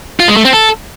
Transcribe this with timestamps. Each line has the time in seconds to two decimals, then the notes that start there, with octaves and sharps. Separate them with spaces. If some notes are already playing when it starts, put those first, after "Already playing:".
0.20 F4
0.28 G#3
0.36 A3
0.45 C4
0.53 A4